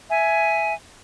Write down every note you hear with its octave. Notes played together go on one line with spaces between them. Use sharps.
E5 G#5